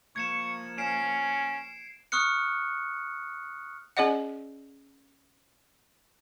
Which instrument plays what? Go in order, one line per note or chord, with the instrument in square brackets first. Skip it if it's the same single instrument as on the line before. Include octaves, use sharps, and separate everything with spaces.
[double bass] F3 A#3 [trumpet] C#6 [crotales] G#6 C#7 E7
[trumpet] C#4 [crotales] C7 D7 E7
[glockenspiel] C#6 D#6 F6 F#6 C#7
[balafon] C#4 G#4 D5 D#5 F#5